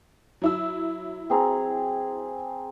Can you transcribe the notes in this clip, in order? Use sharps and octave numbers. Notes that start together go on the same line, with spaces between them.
F#3 E4 E6
C4 G#4 A#5